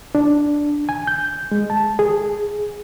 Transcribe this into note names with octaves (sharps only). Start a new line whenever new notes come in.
D4
G#5
G6
G#3
A5
G#4